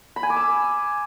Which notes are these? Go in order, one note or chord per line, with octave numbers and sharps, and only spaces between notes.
B5
G#5
D6
E6